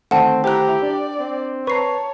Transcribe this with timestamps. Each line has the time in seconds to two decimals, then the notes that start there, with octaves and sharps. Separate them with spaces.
0.11 D2 D#3 A3 C4 F#5 A5
0.44 E4 G4 C5 A#5 F#6
0.83 D4 D5
1.19 C4
1.67 B4 C#5 A5 A#5 C#6 C7